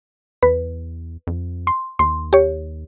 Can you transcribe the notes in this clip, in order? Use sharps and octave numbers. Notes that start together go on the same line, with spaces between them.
E2 B4
F2
C6
D#2 C6
G4 C#5